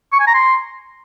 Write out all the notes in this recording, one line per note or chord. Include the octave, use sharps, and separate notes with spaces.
C#6
G#5
A#5
C6